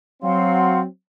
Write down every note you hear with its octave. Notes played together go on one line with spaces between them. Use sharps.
F#3 C4 F5 F#5 C6